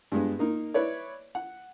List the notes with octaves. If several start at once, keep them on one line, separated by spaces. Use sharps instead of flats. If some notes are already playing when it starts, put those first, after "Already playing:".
G2 G#3 B3
A#3 D#4 A#4
E4 B4 C#5 D5
F#5